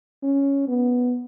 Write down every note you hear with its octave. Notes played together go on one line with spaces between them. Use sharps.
C#4
B3